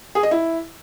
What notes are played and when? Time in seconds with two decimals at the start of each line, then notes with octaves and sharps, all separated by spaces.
0.15 G#4
0.23 D#5
0.31 E4